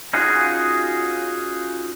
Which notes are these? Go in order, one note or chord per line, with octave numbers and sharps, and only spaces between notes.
C#4 D#4 F4 F#4 G#4